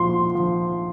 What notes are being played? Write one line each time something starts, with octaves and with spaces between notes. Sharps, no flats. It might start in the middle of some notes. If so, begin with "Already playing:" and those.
Already playing: A#2 F3 C6
F3